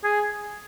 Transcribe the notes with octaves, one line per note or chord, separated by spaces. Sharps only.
G#4